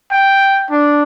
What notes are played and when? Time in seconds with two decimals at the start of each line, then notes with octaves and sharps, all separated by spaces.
0.11 G5
0.71 D4